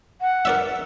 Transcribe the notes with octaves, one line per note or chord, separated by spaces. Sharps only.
F#5
A#4 D5 E5